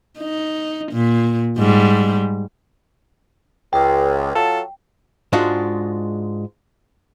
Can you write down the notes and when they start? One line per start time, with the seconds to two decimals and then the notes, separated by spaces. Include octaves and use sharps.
0.19 D#4
0.92 A#2
1.59 G#2 G3
3.73 C#2 G5
4.35 F#3 F4 A4
5.33 G#2 G#3 D4 F4 F#4